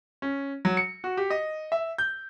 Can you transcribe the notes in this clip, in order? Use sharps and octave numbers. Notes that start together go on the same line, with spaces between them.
C#4
F#3
C#7
F#4
G4
D#5
E5
G6